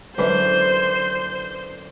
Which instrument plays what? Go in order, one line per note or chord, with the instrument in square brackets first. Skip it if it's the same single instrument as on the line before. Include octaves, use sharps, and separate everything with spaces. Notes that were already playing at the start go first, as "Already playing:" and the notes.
[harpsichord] F#2 D3 E3 [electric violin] C5